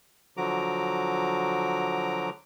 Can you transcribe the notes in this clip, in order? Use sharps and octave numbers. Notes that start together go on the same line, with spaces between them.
D3 F3 F#3 F#4 A#5 D6